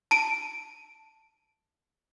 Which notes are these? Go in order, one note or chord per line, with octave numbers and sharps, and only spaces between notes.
A5 D7 D#7